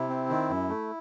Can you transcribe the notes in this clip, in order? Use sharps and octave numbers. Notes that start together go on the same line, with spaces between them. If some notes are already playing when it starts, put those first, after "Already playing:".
Already playing: C3 E4
C4
D#3
F#2
A3